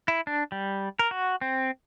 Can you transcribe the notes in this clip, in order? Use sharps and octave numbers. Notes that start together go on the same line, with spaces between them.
E4
D4
G3
A#4
F#4
C4